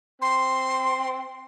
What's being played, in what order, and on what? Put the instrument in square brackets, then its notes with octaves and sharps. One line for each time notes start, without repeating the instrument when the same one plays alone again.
[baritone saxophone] C4 [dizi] C6